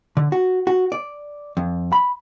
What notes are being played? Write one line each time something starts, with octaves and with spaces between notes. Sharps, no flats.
D3
F#4
F#4
D5
F2
B5